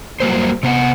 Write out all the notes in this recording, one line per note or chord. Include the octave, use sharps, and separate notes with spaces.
F#3 G3 A#3 C5
C3 B3 F#5